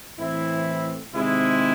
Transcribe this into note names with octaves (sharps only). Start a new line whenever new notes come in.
A2 E3 C4 E4
C3 D#3 G#3 C4 E4